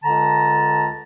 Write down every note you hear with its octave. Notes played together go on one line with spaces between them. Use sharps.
C#2 D3 A5 A#5